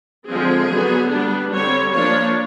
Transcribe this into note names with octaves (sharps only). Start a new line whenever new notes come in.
D3 F3 G#3 C4 G#4
D3 F#3 B3
G3 B3 D4
D3 G3 C4 C#5
F3 A#3 D4 C#5